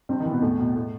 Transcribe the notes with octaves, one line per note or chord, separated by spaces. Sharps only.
G2 C3 C4
D#3 D#4
E3
B2 B3
E2 A2 A3
B2
A2